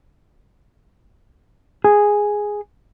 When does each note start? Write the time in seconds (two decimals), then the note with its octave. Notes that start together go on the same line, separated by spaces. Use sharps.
1.84 G#4